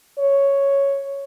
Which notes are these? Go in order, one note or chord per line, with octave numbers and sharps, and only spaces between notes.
C#5